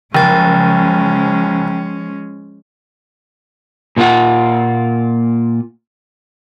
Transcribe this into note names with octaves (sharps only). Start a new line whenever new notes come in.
F#1 F3 G#3 C#4 G5 A6
A#2 D3 A#3 F4 F#5